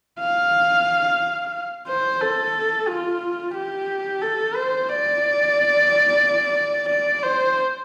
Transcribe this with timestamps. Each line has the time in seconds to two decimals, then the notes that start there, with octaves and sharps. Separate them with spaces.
0.20 F5
1.87 C5
2.20 A4
2.87 F4
3.54 G4
4.21 A4
4.55 C5
4.89 D5
6.89 D5
7.23 C5